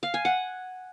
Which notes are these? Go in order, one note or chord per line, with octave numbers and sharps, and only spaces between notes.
F5
G#5
F#5